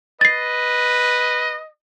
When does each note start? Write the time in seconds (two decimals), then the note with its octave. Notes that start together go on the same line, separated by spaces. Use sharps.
0.21 B4 D#5 A6 C7